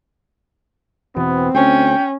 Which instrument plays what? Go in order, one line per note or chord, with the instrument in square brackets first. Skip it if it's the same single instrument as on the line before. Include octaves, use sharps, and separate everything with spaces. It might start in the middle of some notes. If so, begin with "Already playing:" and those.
[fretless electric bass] E2 B2 E3 [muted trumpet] B3 [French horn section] C4
[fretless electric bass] D2 [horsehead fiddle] C#4 [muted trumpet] G5